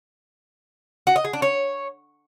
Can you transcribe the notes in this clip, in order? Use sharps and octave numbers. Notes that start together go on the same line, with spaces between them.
F#4
D#5
G#4
D4
C#5